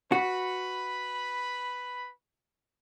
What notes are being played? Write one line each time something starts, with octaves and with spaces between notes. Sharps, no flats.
F#4 B4 B5